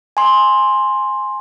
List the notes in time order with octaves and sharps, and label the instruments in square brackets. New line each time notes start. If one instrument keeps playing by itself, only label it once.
[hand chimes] G#5 C6